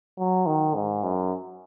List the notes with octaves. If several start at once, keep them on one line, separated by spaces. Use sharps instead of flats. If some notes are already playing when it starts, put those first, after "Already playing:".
F#3
D#3
G#2
F#2